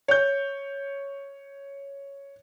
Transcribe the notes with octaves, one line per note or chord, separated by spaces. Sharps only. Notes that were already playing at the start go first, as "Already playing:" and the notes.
C#5 G6